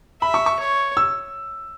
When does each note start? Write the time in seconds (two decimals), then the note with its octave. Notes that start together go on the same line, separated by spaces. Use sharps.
0.21 E5 B5
0.34 C#6
0.46 C#6
0.59 C#5
0.97 E6